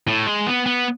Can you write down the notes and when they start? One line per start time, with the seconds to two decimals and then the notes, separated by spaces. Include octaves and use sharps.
0.08 A2
0.27 G#3
0.46 B3
0.66 B3